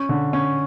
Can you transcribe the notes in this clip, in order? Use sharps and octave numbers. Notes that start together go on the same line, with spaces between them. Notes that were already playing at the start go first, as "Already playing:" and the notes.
Already playing: C#4
D3
C#4